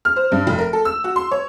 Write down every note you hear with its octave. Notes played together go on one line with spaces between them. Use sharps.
F6
C5
G2
F1
A#4
A4
E6
F#4
C6
C#5